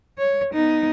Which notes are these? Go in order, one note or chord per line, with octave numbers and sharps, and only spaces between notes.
C#5
B3 D#4